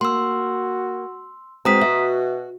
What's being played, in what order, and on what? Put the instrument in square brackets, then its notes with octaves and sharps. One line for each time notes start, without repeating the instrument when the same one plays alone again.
[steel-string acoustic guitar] A#3 [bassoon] F#4 [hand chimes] C6 E6
[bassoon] B2 [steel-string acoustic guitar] G#3 C4 [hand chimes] A#5 D#6 B6
[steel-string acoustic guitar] F#4 [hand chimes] E5